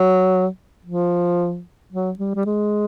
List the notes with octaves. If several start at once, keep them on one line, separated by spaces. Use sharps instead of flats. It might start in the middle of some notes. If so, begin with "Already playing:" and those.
Already playing: F#3
F3
F#3
G3
G3
G#3